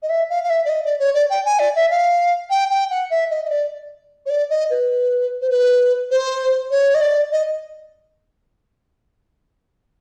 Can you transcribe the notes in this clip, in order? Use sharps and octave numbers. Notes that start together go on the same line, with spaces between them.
D#5
E5
F5
F5
E5
D5
D#5
D5
C#5
D5
G5
G#5
D5
E5
F5
G5
G5
F#5
E5
D#5
D#5
D5
C#5
D5
D#5
B4
C5
B4
C5
C#5
D#5
D5
D#5